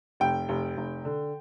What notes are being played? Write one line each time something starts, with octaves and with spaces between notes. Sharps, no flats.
F1 G5
F1
F1
D3